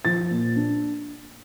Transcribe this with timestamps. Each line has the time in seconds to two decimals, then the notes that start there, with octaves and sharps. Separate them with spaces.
0.05 F3 A6
0.31 A#2
0.56 D4